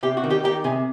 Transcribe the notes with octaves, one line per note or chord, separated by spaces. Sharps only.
C3 G4
F#4
D#3
G4
D#3 G4
C3 G#4